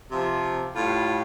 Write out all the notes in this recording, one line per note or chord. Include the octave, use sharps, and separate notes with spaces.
C3 F3
A2 G3 F4